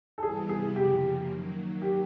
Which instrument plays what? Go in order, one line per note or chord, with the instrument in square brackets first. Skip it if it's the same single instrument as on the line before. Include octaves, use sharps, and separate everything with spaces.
[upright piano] A4
[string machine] C3 E3 G3 B3 E4 [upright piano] G#4
[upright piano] G#4
[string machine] F#2 C#3 F3 A#3 [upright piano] G4
[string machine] D#3 F#3 A#3
[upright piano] G4